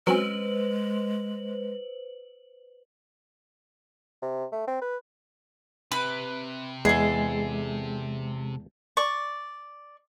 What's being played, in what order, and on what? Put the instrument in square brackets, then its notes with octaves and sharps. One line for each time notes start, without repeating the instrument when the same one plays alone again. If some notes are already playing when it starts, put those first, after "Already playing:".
[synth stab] F#3 C4 C#4 [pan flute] G#3 [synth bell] B4 C5 F#7
[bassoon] C3
A3
C4
B4
[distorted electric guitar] C3 [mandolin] B4
[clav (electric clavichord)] E2 [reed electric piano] G#3 [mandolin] G#4 A4
[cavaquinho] D5 C#6